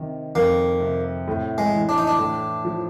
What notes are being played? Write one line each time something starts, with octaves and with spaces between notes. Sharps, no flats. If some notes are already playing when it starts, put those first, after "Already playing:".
Already playing: C3 D#3
F2 A#3
C3
A2
G#3
E3
D4
D#4
D4
A2
F3